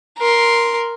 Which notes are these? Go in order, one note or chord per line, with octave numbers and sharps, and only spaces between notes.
A#4 C6